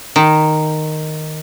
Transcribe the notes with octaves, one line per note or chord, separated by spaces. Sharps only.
D#3